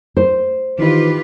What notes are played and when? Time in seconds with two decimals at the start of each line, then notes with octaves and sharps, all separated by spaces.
0.17 C5
0.79 D#3 E3 D#4 F4 G4 B4